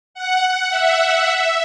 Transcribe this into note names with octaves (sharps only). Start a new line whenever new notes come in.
F#5
E5
E5